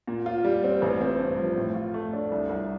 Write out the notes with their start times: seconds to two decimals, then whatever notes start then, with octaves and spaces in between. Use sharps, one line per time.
0.07 A#2
0.26 F4
0.44 G3
0.64 C4
0.82 A1
1.01 C4
1.20 G2
1.38 F3
1.57 A2
1.75 F4
1.94 A3
2.13 D4
2.32 C2
2.49 C2